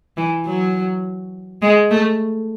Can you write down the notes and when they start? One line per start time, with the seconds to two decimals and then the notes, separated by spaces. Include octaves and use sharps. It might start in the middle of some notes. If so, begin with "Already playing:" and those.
0.17 E3
0.46 F#3
1.62 G#3
1.91 A3